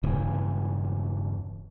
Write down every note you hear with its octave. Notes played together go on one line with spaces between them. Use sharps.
E1 G2 C#3 E3